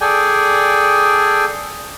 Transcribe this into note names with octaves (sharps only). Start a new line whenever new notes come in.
G#4 A4 D5 G5 G#5